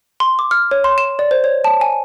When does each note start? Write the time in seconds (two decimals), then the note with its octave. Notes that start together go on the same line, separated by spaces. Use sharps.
0.20 C6
0.39 D6
0.51 F6
0.71 C#5
0.84 C6
0.98 E7
1.19 D5
1.31 C5
1.44 C#5
1.64 A5
1.81 G#5